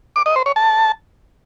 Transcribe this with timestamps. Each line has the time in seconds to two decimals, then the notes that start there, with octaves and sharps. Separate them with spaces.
0.16 D6
0.26 D#5
0.36 C5
0.46 C#5
0.56 A5